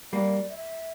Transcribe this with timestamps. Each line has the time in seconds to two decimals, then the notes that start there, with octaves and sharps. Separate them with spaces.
0.12 G3 A#3 D5
0.49 E5